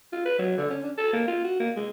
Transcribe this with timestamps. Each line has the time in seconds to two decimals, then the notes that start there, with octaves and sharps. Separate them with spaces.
0.12 F4
0.25 B4
0.38 F#3
0.57 D3
0.70 C#4
0.83 D4
0.97 A4
1.13 A#3
1.27 F4
1.44 F#4
1.60 A#3
1.76 G#3